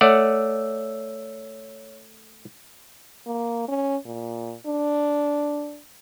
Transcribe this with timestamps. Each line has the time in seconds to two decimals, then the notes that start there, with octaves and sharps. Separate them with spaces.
0.01 A3 C#5 D5 F#5 E6
3.27 A#3
3.68 C#4
4.05 A#2
4.66 D4